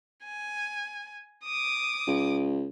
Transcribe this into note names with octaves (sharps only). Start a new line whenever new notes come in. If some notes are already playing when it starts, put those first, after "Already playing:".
G#5
D6 D#6
C#2